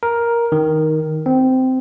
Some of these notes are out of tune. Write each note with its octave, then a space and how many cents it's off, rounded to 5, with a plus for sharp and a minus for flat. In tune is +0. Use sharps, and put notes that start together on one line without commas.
A#4 +10
D#3 +5
C4 -15